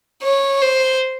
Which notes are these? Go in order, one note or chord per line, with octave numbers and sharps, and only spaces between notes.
C#5
C5